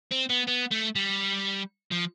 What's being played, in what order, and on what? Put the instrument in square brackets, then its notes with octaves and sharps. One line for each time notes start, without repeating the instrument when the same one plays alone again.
[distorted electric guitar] C4
B3
B3
A3
G3
F3